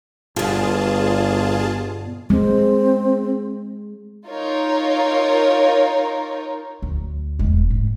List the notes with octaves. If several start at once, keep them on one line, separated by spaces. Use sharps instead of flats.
G1 G2 B2 F4 G#4 A5
G#3 C4
D#4 F4 A#4 C#5
D2
E1 G#3
G#2